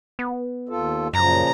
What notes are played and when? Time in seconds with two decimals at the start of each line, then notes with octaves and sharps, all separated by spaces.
0.19 B3
0.69 D#2 F4 A4
1.14 F#2 A#2 C#3 F3 A#5